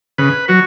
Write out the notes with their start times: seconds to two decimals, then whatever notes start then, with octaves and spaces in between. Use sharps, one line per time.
0.18 C#3 B4
0.48 F#3 F#4